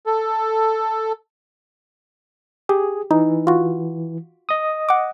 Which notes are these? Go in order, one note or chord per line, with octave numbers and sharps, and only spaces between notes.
A4
G4 G#4
E3 D#4
F4 F#4
D#5 D#6
F#5 D6